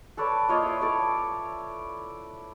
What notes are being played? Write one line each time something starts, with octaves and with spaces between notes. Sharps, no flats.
A4 B4 C#5 D5
A#3 F4 C#5 D#5
E4 B4 D5
A4 C#5 D5